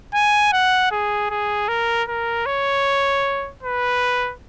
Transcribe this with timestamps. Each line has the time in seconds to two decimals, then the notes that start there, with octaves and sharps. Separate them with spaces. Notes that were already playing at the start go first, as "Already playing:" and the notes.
0.14 G#5
0.53 F#5
0.91 G#4
1.30 G#4
1.68 A#4
2.08 A#4
2.46 C#5
3.63 B4